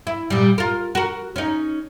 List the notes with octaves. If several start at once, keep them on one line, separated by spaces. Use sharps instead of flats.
E4
A#2 G3
F4 A#4
F#4 A#4
C#4 D#4